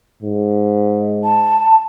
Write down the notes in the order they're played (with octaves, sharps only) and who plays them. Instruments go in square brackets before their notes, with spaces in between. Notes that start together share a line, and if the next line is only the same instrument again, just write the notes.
[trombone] G#2
[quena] A5